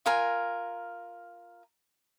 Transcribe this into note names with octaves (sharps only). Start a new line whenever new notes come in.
F4 A#4 G#5